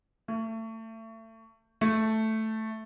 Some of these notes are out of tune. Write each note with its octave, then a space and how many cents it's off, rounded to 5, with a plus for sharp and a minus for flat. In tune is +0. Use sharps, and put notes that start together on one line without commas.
A3 +30
A3 +0